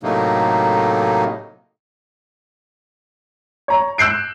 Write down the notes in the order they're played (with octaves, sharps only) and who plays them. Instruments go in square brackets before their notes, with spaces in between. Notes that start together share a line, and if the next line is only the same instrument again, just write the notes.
[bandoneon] A2 C3 F#3 A3 A#3 D#4
[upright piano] C#5 A#5
E6 F#6 G6 C7 D7